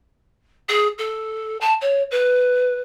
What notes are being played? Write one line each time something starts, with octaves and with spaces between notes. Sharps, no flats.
G#4
A4
A5
C#5
B4